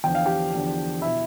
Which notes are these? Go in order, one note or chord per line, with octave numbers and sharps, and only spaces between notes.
E2 D3 F3 G5
F5
G4 G5
E2 D3 F3
B2 E4 E5